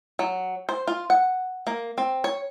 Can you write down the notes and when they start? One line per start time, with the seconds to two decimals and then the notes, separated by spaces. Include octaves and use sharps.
0.19 F#3
0.69 C5
0.87 F4
1.10 F#5
1.67 A#3
1.98 C4
2.24 C#5